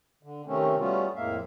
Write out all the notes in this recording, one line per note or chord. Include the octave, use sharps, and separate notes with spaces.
D3
C3 D#3 A3 C4 C#4
G3 A3 B3 C#4 F4 F#4
F2 A2 G#3 A#3 E5 F5